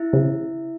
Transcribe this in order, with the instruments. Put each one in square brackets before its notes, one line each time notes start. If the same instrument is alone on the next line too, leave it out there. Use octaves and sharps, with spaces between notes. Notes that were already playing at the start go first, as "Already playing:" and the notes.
Already playing: [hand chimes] E4 E5
[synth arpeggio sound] C#3